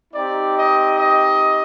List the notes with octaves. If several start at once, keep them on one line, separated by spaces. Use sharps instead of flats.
C4 D#4 G4 D5
D#5
D#5